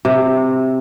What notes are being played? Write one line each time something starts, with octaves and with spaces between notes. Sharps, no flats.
C3